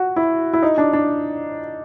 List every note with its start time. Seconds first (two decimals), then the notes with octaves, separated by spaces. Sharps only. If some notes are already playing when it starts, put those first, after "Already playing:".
Already playing: F#4
0.16 E4
0.53 E4
0.63 D#4
0.78 D4
0.93 D4